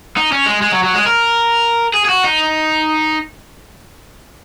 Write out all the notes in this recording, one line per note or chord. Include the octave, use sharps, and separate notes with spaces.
D#4
C#4
G#3
G#3
F#3
F#3
G#3
A#4
G#4
G#4
F#4
D#4